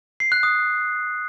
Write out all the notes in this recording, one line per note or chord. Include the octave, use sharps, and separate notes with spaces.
C7
F#6
D#6